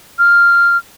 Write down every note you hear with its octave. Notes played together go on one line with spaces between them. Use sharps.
F6